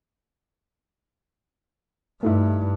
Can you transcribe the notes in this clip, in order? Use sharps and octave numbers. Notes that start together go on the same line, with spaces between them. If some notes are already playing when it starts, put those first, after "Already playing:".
G2 A3 D#4 E4